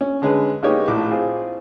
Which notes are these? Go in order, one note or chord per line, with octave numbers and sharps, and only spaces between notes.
C#4
D3 G#3 C#4 G#4 B4
G#3 A#3 B3 D#4 G4 C#5
A#1 A2 D6
C4 F4 G#4